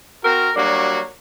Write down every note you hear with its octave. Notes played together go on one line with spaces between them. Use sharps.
C4 F#4 A#4
F#3 G3 A#3 D4 F#4